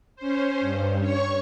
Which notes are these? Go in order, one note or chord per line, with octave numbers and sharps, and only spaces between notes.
C#4 C5
G2
C#5 C#6